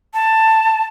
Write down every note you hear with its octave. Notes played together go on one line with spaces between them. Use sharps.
A5